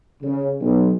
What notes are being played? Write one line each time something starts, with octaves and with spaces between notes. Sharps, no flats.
C#3
B1